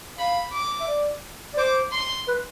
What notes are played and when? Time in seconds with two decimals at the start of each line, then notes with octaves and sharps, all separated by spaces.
0.18 F5 B5
0.52 D6
0.80 E5
0.87 D5
1.54 D5
1.57 C5 D6
1.92 C6
2.28 B4